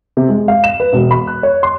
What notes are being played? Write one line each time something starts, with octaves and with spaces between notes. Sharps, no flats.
C3
G#3
F5
E7
B4
E1
B5
F#6
C#5
C6